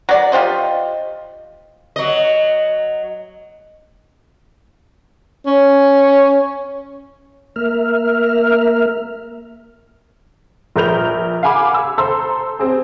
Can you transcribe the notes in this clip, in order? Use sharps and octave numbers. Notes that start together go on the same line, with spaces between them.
F#3 D5
F4 G4 C5 D#5
F#3 D#5
C#4
A#3 A#4 E5 F6
A#1 A#4 B4 G6 F7
F5 F#5 G#5 B5 D6
E6
A4 C5 A#5 C6 E6
C4 G#4